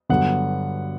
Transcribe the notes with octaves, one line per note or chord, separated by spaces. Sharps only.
G2 D3 F#3 B3 F#5